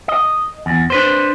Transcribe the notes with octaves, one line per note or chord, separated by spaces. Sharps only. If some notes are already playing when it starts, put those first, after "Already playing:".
D#5
E2
D4 B4 C5